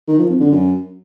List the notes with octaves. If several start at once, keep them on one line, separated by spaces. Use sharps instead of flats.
D#3
F3
F2
D3
F#2